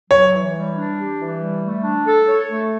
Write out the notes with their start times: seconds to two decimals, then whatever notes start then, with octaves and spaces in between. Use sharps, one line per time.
0.10 F#3 C#5
0.33 E3
0.54 G3
0.76 D4
0.98 G4
1.20 E3
1.41 G3
1.63 A3
1.84 D4
2.07 A4
2.28 C#5
2.50 A3